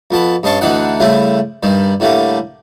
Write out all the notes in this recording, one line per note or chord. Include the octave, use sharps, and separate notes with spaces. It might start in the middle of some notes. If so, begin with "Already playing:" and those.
F2 B3 A5 B5
G2 C#4 D#5 A5 C6 C#6
D2 D3 E3 D4 D#4 F#5
C#3 G3 A3 C4 E4
G2 D#3 G3
A2 D3 G3 A3 A#3